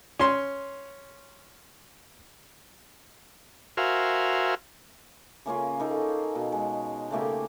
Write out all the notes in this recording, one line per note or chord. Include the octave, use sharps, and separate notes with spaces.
C#4 C6
F#4 A#4 C5 E5 F5 G#5
C#3 A#3 C#4 F4
A#3 D#4 A4
B2
G#3
C#3 A3 A#3 G4